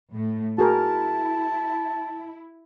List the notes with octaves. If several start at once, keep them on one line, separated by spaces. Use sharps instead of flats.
A2 A3
E4 F#4 G#4 A#4 A5